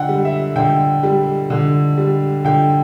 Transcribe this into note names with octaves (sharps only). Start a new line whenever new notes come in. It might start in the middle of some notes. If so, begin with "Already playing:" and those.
Already playing: D3 F#5 G5
G3
E5
D3 G5
G3
D3
G3
D3 G5